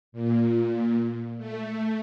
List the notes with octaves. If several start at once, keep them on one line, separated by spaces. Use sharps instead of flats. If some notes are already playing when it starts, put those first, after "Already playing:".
A#2
A3